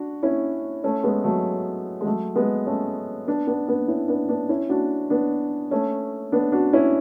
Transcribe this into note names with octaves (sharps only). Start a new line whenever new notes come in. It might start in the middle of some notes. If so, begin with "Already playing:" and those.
Already playing: D4 F#4
C#4 E4
A3 C#4
G#3 B3
F#3 A3
G#3
F#3 A3
G#3 B3
A3 C#4
B3 D4
B3 D4
B3 D4
C#4 E4
B3 D4
B3 D4
C#4 E4
D4 F#4
B3 D4
A3 C#4
B3 D4
D4 F#4
C#4 E4